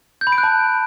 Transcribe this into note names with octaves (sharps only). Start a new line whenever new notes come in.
G6
B5
D7
F#6
A5